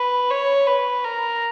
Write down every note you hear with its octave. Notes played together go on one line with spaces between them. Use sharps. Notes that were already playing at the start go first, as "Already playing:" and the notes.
Already playing: B4
C#5
B4
A#4